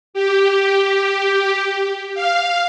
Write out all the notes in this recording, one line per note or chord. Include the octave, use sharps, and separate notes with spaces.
G4
F5